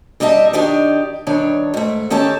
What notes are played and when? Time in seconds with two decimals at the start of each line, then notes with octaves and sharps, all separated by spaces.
0.20 A#2 G3 D#4 D#5 E5 A5
0.53 D#3 D4 D#4 G4 D5
1.27 G2 D#3 D4 C#5
1.74 G#2 A3
2.10 D#3 C#4 G4 A4 A5